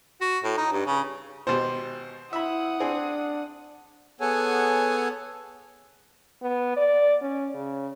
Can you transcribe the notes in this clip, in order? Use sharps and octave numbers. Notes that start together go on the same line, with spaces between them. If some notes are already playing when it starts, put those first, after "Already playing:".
F#4
A2
D#4
G2
C#3
G#1 B2 G4 C5
E4 E5 F#5 B5 D#6
C4 D4 G#4
B3 G#4 A4 C#5 F#5 G#5
B3
D5
C#4
C#3